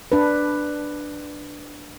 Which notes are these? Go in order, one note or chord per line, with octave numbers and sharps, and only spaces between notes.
D4 B4